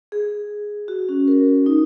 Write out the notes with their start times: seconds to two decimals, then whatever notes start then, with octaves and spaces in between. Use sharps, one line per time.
0.12 G#4
0.88 F#4
1.09 C#4
1.28 A#4
1.66 D#4